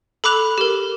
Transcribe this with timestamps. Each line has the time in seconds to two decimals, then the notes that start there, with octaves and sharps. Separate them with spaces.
0.24 A4 B5 D6 F#6 F7
0.58 G4 A#4